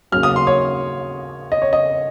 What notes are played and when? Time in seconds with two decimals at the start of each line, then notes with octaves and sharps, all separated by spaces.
0.12 D#2 C#3 F#3 F6
0.23 D#6
0.36 C6
0.47 C#5
1.52 D#5
1.62 C#5
1.73 D#5